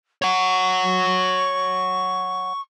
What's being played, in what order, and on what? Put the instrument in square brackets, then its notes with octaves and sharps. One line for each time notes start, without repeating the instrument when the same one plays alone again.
[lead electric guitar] C#5 F#5 [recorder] C#6